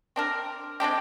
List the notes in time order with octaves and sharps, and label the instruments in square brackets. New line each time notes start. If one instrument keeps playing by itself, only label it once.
[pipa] C4 D4 A#4
G#3 C4 D4 G4